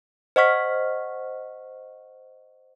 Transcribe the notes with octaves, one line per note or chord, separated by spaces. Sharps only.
C5 D#5 F#5 C#6 F6 B6